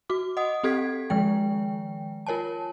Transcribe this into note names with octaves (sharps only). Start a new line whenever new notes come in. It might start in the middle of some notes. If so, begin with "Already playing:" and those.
F#4 D6
D#5 F#5 D#6
C4 G4 A4 G#6 B6
D#3 F3 G#3 G5
F4 A#4 C#5 G#5 A5